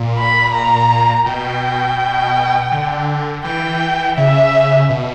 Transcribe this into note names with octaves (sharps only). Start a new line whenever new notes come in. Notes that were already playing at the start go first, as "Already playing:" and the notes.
Already playing: A#2
B5
A#5
B2 G5
D3
E3 G5
C#3 E5
B2